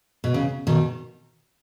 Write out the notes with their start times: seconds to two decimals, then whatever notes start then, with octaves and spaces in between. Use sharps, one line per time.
0.24 B2
0.34 C#3
0.67 B2 D#3